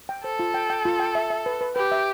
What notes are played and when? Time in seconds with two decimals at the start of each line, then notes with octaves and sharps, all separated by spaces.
0.09 G5
0.24 A4 C5
0.39 F4
0.54 G5
0.70 G5
0.85 F4
1.00 G5
1.15 E5
1.30 E5
1.46 B4
1.61 B4
1.75 G4 B4
1.91 E5